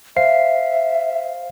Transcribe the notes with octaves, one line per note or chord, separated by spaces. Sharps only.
C5 E5 F5 C7